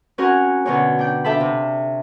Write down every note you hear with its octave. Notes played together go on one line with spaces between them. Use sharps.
C4 C#4 F#4 A#4 G#5
B2 D3 C#4 A#4 C#5
D4 G5
D4 A4 E5 F5 A5 B5
C3